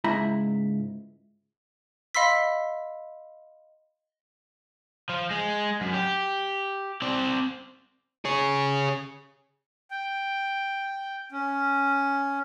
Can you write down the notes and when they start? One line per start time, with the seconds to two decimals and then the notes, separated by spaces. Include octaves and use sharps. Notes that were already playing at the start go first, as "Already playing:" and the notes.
0.04 C#2 G#2 E4 A#5
2.15 D#5 F5 B5 C6 E6 B6
5.09 F3
5.31 G#3
5.81 F#2
5.93 G4
7.02 C4 D5
8.25 G#4 C#5
9.91 G5
11.32 C#4